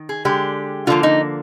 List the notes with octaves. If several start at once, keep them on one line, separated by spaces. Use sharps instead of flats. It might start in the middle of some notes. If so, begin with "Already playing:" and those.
Already playing: D#3
G#4
D3 G#3 G4
D3 F3 A#3 F4
D#4